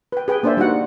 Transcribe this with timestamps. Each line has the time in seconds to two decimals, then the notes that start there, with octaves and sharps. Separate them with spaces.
0.12 B4 G5
0.28 G#4 B4 G5
0.43 A#3 D4 C5 D5 E5
0.57 G3 D#4 F#4 F#5